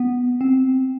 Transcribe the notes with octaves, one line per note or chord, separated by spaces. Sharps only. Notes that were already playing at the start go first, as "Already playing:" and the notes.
Already playing: B3
C4